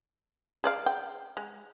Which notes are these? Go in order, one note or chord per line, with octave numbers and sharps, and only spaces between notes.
G#4 D5 F5
G5
G#3